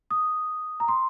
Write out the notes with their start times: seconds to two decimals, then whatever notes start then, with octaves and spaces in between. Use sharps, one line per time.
0.11 D#6
0.80 A#5
0.88 C6